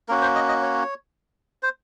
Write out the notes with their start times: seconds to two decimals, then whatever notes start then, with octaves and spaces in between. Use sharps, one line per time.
0.09 A#3 C#4 F#4 A#4
0.22 C5
0.35 D#5
0.49 D#5
0.62 C#5
1.63 C5